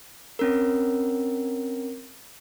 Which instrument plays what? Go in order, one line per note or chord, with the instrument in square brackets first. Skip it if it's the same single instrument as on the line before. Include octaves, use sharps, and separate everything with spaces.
[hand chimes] C4 C#4 A#4